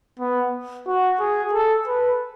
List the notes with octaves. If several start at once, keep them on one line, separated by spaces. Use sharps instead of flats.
B3
F#4
G#4
A4
B4